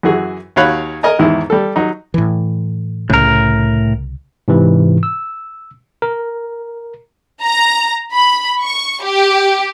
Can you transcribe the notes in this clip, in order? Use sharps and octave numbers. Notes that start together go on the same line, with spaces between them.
F#2 E3 F#4 G#4
D#2 F#4 C#5 F5 B5 F#6
A#4 D#5 G#5 A#5
E2 G#2 D#3 E4
G3 A4
F#3 D#4
A2 E3
C2 A2 C#3 A#4
G#2 C3 E3
E6
A#4
A#5
B5
C#6
G4